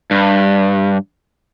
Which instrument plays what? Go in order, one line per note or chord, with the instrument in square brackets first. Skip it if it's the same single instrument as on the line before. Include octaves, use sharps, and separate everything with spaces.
[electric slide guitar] G2